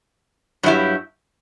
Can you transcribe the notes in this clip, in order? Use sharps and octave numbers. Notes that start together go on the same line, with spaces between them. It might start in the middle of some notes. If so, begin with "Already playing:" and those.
G2 F#3 C4 E4 G4